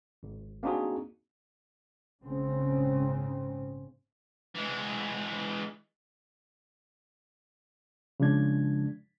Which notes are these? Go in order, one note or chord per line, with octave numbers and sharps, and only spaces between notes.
G#1
A#3 C4 D4 D#4 F#4 G#4
A#1 G#2 C#3 C4
E3 G#3
C#3 F3 G#3 D4 G#6